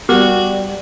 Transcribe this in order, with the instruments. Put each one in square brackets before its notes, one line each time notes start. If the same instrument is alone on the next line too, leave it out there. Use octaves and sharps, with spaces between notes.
[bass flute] G3 [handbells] B3 G4 A#4 [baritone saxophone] F#4